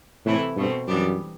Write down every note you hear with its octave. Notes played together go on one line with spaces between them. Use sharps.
A2 C3 E3 A3 E4
G2 B2 A3 C4
F#2 E3 G3 B3 D4 G4